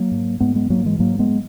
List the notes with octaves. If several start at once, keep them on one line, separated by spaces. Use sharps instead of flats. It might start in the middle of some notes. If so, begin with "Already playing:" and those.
Already playing: F#3 A#3
G#2
G#2 G#3 B3
G#3 B3
G#2 F#3 A#3
E3 G#3
G#2 F#3 A#3
G#3 B3